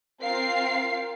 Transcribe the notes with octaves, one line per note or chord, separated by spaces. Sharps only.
C4 F4 A#4 F5 C7